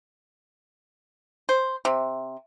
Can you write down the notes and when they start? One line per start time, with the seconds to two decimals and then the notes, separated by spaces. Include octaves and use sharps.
1.49 C5
1.85 C3